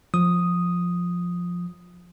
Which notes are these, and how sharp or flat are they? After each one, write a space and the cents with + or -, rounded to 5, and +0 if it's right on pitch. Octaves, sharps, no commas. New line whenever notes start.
F3 +10 D#6 +0